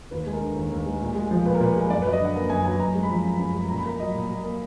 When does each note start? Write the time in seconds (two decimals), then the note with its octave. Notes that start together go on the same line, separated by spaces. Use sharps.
0.11 D#2 B4
0.26 G#3
0.33 A#4
0.41 D3
0.56 D#2
0.71 D#2
0.86 G#3
1.01 A#2
1.15 G#3
1.31 F3
1.45 A#2 B4
1.55 A#4
1.60 A#2 B4
1.76 G#3
1.90 F#2 D5
2.02 B4
2.06 F#3 D5
2.13 D#5
2.21 D3 F#5
2.35 A#3
2.50 F#2 G#5
2.64 F#3 G#5
2.79 F#2 A#5
2.94 G#3
3.03 B5
3.10 F3
3.24 F#2
3.39 F#2
3.54 G#3
3.69 A#2 A#5
3.77 B5
3.85 A#3 A#5
4.00 F#3 D#5
4.14 A#2
4.29 A#2
4.44 A#3